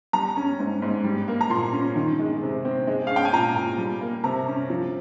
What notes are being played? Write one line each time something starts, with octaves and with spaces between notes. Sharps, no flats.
G3 A#5
C#4
G#2
G#2
G3
A#3
A#5
A#2 C6
C#4
D#3
G#3
C3
C4
G#3
F5
C#4
G5
G#5
A#2 A#5
A#2
G3
A#3
C3 A#5
C#4
F3